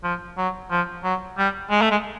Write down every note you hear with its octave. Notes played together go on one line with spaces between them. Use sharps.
F3
F#3
F3
F#3
G3
G#3
A3
G#3